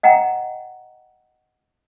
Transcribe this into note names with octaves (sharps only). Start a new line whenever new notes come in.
D#5 F#5 G5 A#5